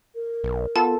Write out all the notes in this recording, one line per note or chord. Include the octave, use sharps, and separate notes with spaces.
A#4
B1
B3 F4 A4 A5